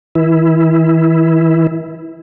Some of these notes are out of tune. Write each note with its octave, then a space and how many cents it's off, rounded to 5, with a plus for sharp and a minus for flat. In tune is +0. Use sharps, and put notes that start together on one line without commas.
E3 -35 E4 +0